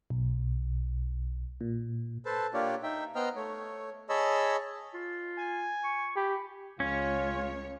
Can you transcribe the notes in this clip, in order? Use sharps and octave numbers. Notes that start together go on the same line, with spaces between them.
B1
A#2
A4 B4 C5 A5
A#3 D4 F4 G4 C#5 D5
D#4 E5 G5
B3 C5 D#5 G5 A#5 F6
A3 C#5
G#4 C#5 D#5 A5 B5 E6
F4
G#5
C#6
G4 B5
C#2 C#4 F4 C#5